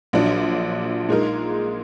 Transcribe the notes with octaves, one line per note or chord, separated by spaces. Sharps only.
A#1 A#2 F#3 D4
A#2 G#3 D#4 A#4